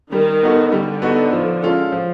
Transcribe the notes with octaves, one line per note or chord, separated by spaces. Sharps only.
D#3 G3
B3 D#4 F#4 A4
D3 G3
B3 D#4 F#4 A4
F3
G#3 C#4 F4 A4
F3